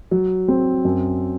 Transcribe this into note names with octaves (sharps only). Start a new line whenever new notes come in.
F#3
C4
F#2